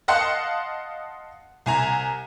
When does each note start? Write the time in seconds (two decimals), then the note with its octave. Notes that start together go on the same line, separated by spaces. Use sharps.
0.08 D#5 F5 F#5 A5 C6 F#6
1.66 C2 G#5 A#5